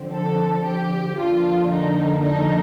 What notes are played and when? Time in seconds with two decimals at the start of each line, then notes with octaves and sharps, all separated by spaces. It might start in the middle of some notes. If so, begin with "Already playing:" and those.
Already playing: D3 F3 C4
0.13 A4
0.65 G4
1.18 F2 D3 F3 A#3 D4 F4
1.71 D#4
2.24 D#4